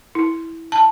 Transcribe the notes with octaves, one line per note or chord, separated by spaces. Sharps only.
E4
A5